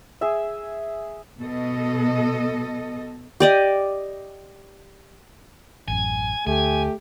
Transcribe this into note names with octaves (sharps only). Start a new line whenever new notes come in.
G#4 E5
B2 A4 D#5
G4 D5 D#5
A1 F#2 G#5
D2 A3 G4 G#5